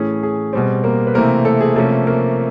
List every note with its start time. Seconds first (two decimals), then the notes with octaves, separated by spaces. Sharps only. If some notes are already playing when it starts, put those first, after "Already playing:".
Already playing: A2 E3 A3 C#4 G#4
0.23 G#4
0.53 B2 G3 C4
0.84 A#3 A#4
1.07 B4
1.14 C3 E3 A3 A#3 C4 A#4
1.45 A3 A4
1.61 G#4
1.76 C3 F3 A3 A#3 C#4 A4
2.07 A#3 A#4